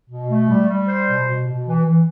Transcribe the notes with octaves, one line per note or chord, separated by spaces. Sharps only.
B2
A3
G3
G3
C5
B2
B2
B2
E3
E3